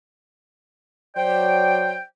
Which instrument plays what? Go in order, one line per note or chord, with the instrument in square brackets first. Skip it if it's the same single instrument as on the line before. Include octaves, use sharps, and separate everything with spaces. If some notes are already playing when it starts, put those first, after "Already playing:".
[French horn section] F#3 D5 [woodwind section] C5 G5